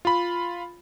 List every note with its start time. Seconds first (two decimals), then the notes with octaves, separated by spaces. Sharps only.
0.05 F4 B5